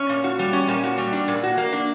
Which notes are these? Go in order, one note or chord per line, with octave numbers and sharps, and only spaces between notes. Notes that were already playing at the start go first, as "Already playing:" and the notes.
Already playing: C#4
A#2
F#4
G3
C#4
A#2
F#4
G3
D4
A#2
F#4
A#3
D4